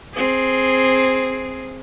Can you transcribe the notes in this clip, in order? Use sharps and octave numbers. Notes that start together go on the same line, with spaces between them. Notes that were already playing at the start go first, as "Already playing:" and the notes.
C4 G#4